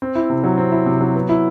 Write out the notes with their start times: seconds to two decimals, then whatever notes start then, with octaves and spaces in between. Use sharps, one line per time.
0.02 C4
0.15 E4
0.30 C3
0.44 F#3
0.58 C4
0.72 E4
0.86 C3
1.01 F#3
1.15 B3
1.29 E4